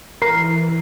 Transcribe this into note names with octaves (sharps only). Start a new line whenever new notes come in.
E3 A#4 C7